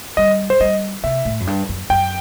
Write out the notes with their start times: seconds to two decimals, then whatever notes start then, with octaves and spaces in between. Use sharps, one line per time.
0.17 G3 D#5
0.50 C5
0.60 G3 D#5
1.04 C3 E5
1.25 A2
1.40 F#2
1.47 G2
1.69 F#2
1.90 F#2 G5